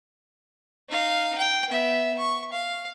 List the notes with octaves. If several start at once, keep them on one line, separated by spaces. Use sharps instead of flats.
D#4 F5
G5
B3 E5
C#6
F5